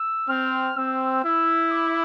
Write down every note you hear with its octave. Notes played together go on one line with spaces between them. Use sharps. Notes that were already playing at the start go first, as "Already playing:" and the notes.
Already playing: E6
C4 F6
C4 E6
E4 E6
D6